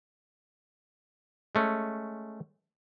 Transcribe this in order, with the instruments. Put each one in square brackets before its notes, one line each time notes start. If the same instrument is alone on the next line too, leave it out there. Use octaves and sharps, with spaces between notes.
[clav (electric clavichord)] G#3 A3 C#4